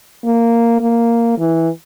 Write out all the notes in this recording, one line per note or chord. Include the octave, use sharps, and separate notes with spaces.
A#3
A#3
E3